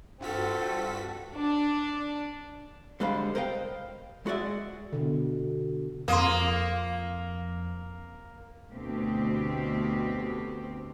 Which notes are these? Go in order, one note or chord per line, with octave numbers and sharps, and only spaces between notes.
G2 C4 F4 F#4 A4 B6
D4
D3 G3 G#3 C5 F5 B5
A#4 C5 D#5 F5 G5
G#3 F#4 G#4 D5 E5
B2 D3
F2 A#3 C6 D#6
D2 B2 C4 G4